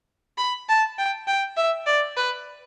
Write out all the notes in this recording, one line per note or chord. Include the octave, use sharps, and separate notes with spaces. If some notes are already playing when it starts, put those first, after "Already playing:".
B5
A5
G5
G5
E5
D5
B4